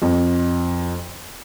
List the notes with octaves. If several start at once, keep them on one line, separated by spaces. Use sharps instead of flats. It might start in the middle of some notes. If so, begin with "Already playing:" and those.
F2